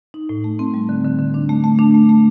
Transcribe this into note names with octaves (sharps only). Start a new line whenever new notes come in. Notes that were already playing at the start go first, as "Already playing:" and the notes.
D#4
A2
A3
C4
G3
D3
D3
D3
D4
A3
A3
D4
A3
A3